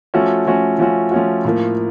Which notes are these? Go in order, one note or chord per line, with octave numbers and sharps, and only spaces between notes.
F3 A3 C#4 F#4
F3 A3 C#4 F#4
F3 A3 C#4 F#4
F3 A3 C#4 F#4
A2 F3 A#3